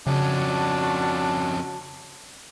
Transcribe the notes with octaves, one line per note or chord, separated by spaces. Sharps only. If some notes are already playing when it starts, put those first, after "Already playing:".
F2 C#3 C#4 D4 F#4 A5